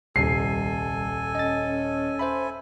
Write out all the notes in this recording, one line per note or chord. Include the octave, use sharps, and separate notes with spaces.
D#1 C2 A4 G#5 C7
C#4 D#5 A6
C5 E5 B5